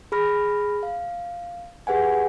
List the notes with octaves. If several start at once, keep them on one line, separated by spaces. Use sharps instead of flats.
G#4 B5 F6 A#6
F5
G4 G#4 B4 F#5 G#5